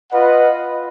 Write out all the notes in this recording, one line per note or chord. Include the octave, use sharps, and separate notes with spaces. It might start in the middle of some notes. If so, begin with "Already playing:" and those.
F4 B4 D#5 F#5